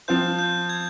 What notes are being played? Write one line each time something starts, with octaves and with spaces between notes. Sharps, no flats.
F3 C4 F4 C5 G6
G6
G#6